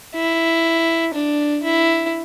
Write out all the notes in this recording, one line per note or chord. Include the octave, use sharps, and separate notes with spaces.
E4
D4
E4